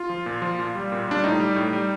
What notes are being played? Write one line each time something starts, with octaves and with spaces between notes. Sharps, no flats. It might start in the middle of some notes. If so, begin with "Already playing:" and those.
Already playing: F4
F3
A#2
F3
A#2
G3
A#2
G3 D4
A2 D#4
G3
A2
G3